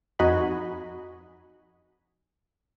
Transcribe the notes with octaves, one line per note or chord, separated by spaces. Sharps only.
F2 D#4 F#4 D#5 G#5 B5